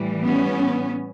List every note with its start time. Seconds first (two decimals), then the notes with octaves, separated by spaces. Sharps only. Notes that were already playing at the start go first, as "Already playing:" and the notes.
Already playing: A2 E3 G3
0.21 B3 C#4